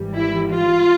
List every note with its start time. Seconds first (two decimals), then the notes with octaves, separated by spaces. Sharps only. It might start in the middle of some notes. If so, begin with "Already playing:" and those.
Already playing: G#1 G#2 E3 G3
0.15 E4
0.50 F4